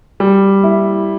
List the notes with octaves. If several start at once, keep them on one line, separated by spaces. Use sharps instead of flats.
G3
E4